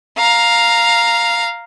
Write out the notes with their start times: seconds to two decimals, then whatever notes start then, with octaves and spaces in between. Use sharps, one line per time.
0.18 F5 A#5